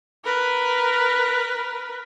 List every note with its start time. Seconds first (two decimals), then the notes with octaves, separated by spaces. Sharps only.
0.24 A#4 B4